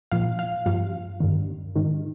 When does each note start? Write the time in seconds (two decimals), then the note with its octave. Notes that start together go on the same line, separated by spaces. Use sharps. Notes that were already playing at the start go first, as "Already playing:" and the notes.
0.11 A#2 F3 F5
0.39 F5
0.66 G2 F3 F5
1.20 G2 D#3
1.75 G#2 D#3